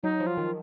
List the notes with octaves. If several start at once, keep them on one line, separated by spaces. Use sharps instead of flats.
F#3 D#4
F3
F4
D#3